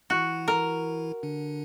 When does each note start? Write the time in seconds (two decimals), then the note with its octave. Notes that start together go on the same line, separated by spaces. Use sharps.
0.10 E3 E4 F#4
0.48 A#4
1.23 D3 D4